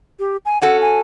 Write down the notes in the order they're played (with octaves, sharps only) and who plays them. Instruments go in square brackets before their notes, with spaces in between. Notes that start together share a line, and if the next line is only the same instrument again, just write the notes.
[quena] G4
G#5
[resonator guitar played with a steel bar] C#4 F#4 A4 [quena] F#5
[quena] G#5